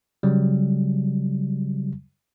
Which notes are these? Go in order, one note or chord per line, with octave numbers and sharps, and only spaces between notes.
C#3 F#3 G3